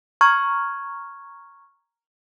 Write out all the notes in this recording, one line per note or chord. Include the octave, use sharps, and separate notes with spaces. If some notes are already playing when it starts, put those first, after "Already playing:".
A#5 C#6 F6 G#6